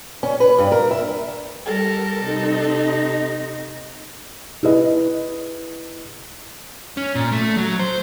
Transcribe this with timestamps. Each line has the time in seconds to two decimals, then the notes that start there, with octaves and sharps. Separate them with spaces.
0.23 C#4
0.40 B4
0.58 G2
0.72 A#4
0.91 E5
1.66 G3 A4 A#4
2.24 C3 D#4
4.63 E4 G#4 B4 D#5
6.97 C#4
7.15 A#2
7.32 A3
7.57 F#3
7.80 C5